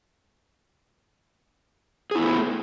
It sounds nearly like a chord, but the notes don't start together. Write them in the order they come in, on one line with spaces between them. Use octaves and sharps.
G#4 E4 B3 A3